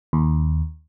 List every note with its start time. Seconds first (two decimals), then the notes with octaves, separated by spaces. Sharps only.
0.13 D#2